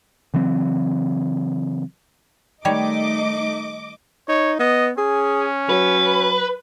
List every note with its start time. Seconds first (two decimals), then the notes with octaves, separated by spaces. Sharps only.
0.34 C#3 E3 F#3 C4
2.65 D#3 G3 A3 D#4 C#5 D#5 D6
4.29 D#4 C#5
4.59 B3 D#5
4.98 C#4 G#4
5.69 F#3 B4